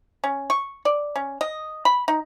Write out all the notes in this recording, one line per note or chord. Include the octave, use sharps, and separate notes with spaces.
C#4
C#6
D5
C#4
D#5
B5
D#4